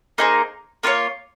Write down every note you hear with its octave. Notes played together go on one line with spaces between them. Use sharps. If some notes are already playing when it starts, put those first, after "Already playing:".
A#3 D#4 G#4 C5
A#3 F4 A#4 C#5